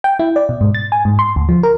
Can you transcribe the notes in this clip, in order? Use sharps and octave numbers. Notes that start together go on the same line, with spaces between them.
G5
E4
D5
B2
G#2
A6
G#5
G#2
C6
D2
F3
A#4